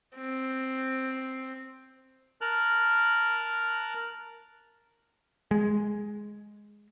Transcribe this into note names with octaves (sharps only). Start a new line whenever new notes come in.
C4
A#4 A5 F6 F#6
G#3